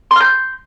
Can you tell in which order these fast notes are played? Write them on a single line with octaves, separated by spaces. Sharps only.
C6 F6 G6